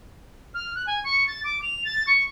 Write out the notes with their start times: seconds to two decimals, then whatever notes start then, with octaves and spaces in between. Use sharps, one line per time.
0.54 F6
0.75 F#6
0.87 G#5
1.04 C#6
1.27 A6
1.44 D6
1.62 F7
1.85 A6
2.07 C#6